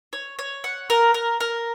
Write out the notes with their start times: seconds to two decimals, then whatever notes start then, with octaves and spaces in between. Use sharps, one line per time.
0.13 C#5
0.39 C#5
0.64 F#5
0.90 A#4
1.14 A#4
1.40 A#4